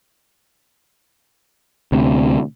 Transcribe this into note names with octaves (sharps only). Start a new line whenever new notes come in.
D2 C3